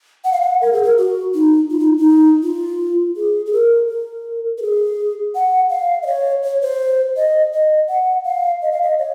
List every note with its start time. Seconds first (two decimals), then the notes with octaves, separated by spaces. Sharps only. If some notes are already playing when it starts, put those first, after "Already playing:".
0.25 F#5
0.32 F5
0.41 F#5
0.61 A#4
0.73 G#4
0.83 A#4
0.98 F#4
1.34 D#4
1.71 F4
1.80 D#4
1.98 D#4
2.43 F4
3.16 G#4
3.46 G#4
3.53 A#4
3.89 A#4
4.58 A#4
4.62 G#4
5.35 F#5
5.71 F5
6.02 D#5
6.07 C#5
6.44 C#5
6.62 C5
7.17 D#5
7.53 D#5
7.89 F#5
8.26 F5
8.62 D#5
8.71 F5
8.82 D#5
8.99 C#5